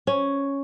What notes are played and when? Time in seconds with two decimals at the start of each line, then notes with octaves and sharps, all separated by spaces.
0.07 C#4